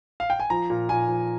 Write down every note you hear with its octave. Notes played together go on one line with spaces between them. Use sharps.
F5
G5
G#5
F3 A#5
A#2
A#2 G#5
F3